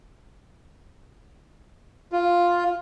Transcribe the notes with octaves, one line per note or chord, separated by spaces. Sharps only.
F4